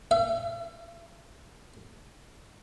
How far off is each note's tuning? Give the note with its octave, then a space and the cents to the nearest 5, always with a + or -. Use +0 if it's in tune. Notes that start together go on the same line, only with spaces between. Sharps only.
E5 +40